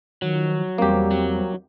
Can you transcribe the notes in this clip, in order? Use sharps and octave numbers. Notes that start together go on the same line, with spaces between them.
D#3 F3 F#3
E2 G3 A#3 C4 G4
F#3